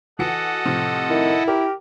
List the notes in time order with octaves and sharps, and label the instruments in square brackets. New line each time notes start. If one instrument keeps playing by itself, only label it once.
[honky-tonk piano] E3 F#4 C#7 [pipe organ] A4 D#5 F#5
[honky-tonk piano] A2 C3 F3
[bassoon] D#3 [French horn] E4
[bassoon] G4 [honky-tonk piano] A#4